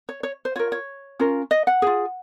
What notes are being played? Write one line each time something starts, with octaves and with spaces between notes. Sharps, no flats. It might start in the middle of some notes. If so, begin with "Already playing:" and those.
C#5
C#5
C5
F4 A#4 C#5
C#5
C#4 F4 A#4
D#5
F#5
F4 G#4